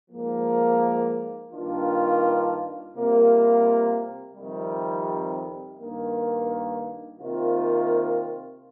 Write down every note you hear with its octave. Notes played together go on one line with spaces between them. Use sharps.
G#2 F3 A#3
G2 D#3 A#3 D4 F4
C3 G3 A#3 F4
F2 C3 D#3 G3
G2 D#3 A#3
C3 D#3 A#3 F4